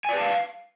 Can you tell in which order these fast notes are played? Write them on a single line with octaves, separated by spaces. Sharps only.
G#5 D5 B4 A5 F5